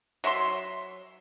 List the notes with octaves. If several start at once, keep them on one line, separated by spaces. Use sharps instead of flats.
F#3 E5 B5 C6